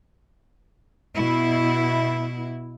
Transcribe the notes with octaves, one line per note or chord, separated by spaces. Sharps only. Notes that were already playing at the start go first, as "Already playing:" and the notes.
B2 E4